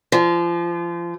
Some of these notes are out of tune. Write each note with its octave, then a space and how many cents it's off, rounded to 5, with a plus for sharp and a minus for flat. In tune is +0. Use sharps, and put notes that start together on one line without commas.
F3 -30